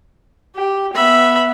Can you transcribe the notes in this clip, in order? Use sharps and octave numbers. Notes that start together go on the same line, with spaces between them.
G4
B3 E5 B5